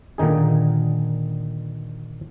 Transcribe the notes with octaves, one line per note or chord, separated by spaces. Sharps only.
A#2 D3 D#3 D#4 G#4